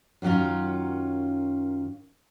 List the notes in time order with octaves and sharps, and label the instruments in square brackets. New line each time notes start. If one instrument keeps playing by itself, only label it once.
[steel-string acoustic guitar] F#2 D#3 F#3 C#4 F4